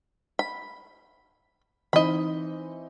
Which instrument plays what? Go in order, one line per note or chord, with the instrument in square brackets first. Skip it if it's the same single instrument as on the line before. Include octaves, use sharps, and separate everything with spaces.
[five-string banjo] B5
[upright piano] E3 C4 D#4 [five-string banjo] D#5 B5